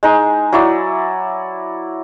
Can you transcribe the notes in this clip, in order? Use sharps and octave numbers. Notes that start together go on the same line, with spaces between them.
G#3 D#4 G#5 C6
F#3 E4 D5